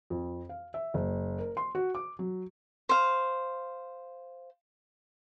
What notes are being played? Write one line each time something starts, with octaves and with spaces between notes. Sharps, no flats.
F2
F5
E5
F#1
A#4
C6
F#4
D6
F#3
C5 F5